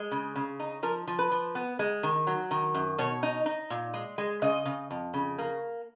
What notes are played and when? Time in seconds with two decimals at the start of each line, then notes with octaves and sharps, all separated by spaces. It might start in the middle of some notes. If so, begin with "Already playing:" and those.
Already playing: G#3
0.11 C#3
0.36 C#3
0.60 D#4
0.83 F3 A#4
1.08 F3
1.19 B4
1.31 F3
1.55 B3
1.79 G#3
2.03 D#3
2.27 F#3
2.51 D#3
2.75 F#2
2.98 B2 C#5
3.23 D#4
3.46 D#4
3.70 A#2
3.94 G#3
4.18 G#3
4.42 C#3 D#5
4.66 C#3
4.91 F2
5.14 C#3
5.38 A#3